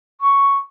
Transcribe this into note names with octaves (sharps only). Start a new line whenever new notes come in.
C#6